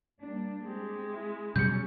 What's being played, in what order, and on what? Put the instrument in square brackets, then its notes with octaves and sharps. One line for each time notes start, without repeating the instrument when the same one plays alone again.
[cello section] G3 A#3 D4
[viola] G#3 [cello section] C4 G4
[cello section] E4
[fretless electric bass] B2 F#3 G3 [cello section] C#4 [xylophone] G6 C#7